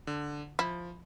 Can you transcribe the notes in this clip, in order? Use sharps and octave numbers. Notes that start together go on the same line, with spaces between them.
D3
F3 E4